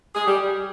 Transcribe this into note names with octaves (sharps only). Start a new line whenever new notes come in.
G#4
G3 G4